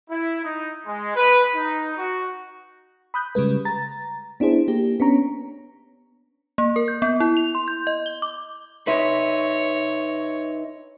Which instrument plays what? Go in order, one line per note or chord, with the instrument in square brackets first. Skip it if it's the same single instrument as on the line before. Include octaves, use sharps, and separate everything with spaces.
[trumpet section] E4
D#4
G#3
B4
D#4
F#4
[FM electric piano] B5 D#6 F#6 G6
C#3 G3 G#3 B4
A#5 A6
B3 D4 E4 G#4 C5
A#3 G4
B3 C#4 D4 C#5 A#5
[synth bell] A#3
A#4
G6
B3
E4
F7
C6
G6
D#5
G7
D6
[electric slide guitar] D#4 B4 [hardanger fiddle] C#5 [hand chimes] E5 C6